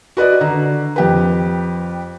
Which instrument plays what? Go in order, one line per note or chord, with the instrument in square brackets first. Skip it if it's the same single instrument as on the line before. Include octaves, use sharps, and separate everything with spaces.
[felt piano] F#4 B4 D5 D#5
D3 A#5
F2 G4 B4